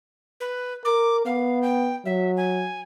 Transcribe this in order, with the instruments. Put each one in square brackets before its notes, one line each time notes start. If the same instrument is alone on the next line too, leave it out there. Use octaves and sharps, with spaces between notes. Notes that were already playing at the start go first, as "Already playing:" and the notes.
[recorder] B4
[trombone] A#4 [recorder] D6
[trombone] B3 [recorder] F5
[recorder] G5
[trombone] F#3 [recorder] E5
[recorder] G#5